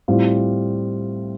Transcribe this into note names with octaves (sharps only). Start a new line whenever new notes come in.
A2 G3 C4 F4